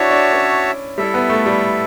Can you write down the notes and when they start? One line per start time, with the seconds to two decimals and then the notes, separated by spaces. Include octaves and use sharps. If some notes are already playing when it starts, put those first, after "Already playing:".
Already playing: D4 E4 F#4 C#5 E5 A5
0.11 D4
0.33 C#4
0.98 G3 E4 A4 E5
1.14 B3
1.30 A3
1.46 G3